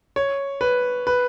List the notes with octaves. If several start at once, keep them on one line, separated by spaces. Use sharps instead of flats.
C#5
B4
B4